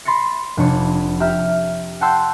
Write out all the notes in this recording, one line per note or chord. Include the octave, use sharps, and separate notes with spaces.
B5 C6 A6 A#6 C#7
F1 D4 C#5
G4 E5 A#5 F6
F#5 G5 A5 C6 E6 G6